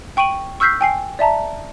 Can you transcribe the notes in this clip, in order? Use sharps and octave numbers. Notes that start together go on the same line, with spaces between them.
G5 C#6 D7 D#7 F#7
C#6 E6 F6 G6 B6 C7
G5 G#5 C7
D5 E5 A5 A#5